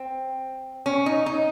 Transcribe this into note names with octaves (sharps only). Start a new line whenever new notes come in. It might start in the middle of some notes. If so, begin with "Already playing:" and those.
Already playing: C4
C#4
D#4
D#4